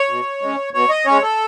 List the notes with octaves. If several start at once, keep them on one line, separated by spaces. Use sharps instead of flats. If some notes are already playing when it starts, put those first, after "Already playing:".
Already playing: C#5
B2
G#3 C#4
B2 C#5
D#5
G#3 C#4 C#5
A4